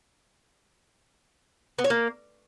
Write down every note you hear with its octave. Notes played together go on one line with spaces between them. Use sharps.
B3
C#5
A#3